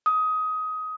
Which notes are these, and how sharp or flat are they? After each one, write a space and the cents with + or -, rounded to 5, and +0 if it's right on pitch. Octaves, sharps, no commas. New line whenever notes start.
D#6 +20